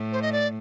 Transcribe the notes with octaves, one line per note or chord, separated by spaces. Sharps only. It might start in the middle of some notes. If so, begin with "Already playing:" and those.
Already playing: A2
C5
D#5
D5